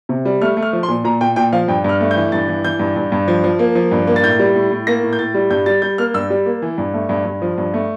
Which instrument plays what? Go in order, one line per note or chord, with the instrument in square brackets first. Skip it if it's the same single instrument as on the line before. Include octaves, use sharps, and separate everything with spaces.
[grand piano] C3
G3
A3 F6
A3
F6
F3
C6
A#2
A#2 A#5
A#2 G5
A#2 G5
F3 F5
G2 G5
G2 F6
A3
G6
E3
G2 A6
E3
E3 G6
G2
G2
G2
F3
F3
A#3
F3
G2
A#3
A6
A2 G6
G3
A2
A2
A#3 A#6
A2
G6
A2 A6
G3
G2 G6
G3 A6
G3 G6
A#3 F6
G2 E6
G3
A#3
E3
G2
A3
G2
G2
F3
G2
A3